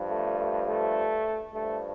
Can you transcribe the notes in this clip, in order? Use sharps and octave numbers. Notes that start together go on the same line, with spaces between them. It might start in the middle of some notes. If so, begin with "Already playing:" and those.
Already playing: G2 F3
A3
A3
A3
G2 F3 A3